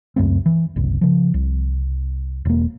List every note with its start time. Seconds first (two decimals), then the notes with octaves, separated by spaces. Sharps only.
0.16 C#2 F#2 A3 C4
0.46 E3
0.76 F#1 C2
1.01 C#3 F3
1.34 C2
2.45 E1 A#3